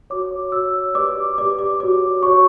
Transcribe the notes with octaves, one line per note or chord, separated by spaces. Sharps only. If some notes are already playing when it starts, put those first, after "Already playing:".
F#4 C#5 D6
F#4 C#5 E6
G4 B4 D5 D6
G4 B4 D5 D6
D6
F#4 C#5 D6
F#4 C#5 C#6